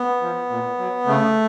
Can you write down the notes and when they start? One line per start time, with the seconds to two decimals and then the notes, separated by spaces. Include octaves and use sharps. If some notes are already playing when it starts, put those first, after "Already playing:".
Already playing: B3
0.22 F3
0.49 A#2
0.78 F#3
1.06 C#3 A3